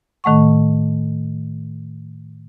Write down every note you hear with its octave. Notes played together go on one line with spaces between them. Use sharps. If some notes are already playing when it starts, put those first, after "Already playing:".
A2 D#3 A3 F#5 C#6